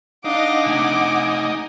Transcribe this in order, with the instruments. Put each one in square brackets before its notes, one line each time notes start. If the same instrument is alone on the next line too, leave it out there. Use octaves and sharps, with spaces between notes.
[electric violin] D4 D#5 [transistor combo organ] D#4 [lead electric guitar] F5 [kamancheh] F#5 D6
[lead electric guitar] C3 A3 [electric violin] G#5